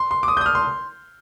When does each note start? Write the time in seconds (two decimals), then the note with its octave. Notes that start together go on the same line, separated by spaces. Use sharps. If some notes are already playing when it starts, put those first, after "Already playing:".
Already playing: C6
0.11 C6
0.23 D6
0.28 D#6
0.37 G6
0.41 D#6
0.46 F6
0.55 C6